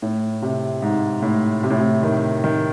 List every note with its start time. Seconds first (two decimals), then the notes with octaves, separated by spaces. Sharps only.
0.02 A2
0.42 C3
0.82 G#2
1.22 A2
1.63 C3
1.70 A2
1.79 C3
2.03 D#3
2.44 D#3